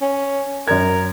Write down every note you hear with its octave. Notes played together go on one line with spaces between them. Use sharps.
C#4
F#2 A#4 G#6